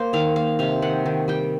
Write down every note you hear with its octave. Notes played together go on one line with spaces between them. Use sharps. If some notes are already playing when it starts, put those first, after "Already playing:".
Already playing: A#3 C5
D#3 F5
A#3 F5
C3 F5
D#3 F#5
D#3
G3 G5